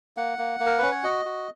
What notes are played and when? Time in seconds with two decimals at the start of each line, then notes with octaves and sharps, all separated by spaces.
0.17 A#3 F#5
0.38 A#3
0.60 A#3
0.66 A#4
0.78 C#4 B4
0.91 C#5
1.04 F#4 D#5
1.25 F#4